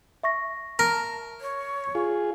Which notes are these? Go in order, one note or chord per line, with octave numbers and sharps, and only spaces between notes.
E5 C#6 A#6
A#4 A5
C#5
F4 G#4